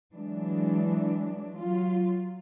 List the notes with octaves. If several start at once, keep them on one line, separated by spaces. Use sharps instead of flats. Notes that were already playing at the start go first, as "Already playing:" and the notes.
E3 F#3 G#3 D4
F#3 F4